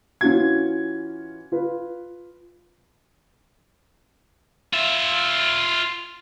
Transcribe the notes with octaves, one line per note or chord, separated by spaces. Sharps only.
E3 C#4 F4 F#4 G#6
F4 B4
F4 E5